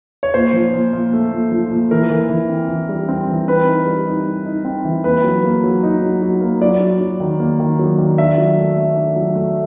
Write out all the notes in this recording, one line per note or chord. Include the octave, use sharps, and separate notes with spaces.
C#5
A#2 C5
F3
A#2
A#2
A3
A#2
F3
A#2
E3 A#4
E3
E3
C4
E3
G3
C4
E3
C4 B4
D#4
G3
D#4
D#4
D#4
C4
E3
A#3 B4
F#3
A#3
F#3
D#4
F#3
F#3
A#3
F#3 D5
F#3
F#3
D#3
A#3
D#3
F#3
D#3
D4 E5
F#3
A3
A3
D4
F#3
A3